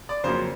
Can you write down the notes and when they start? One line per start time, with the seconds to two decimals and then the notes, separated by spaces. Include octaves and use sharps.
0.09 D5
0.24 F2 C#3 F#3 A#3 C#4 C5